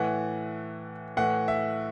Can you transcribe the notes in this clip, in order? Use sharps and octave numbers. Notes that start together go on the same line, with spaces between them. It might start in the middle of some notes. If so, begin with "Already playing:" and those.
Already playing: A2 E3 F#5
A2 E3 F#5
E5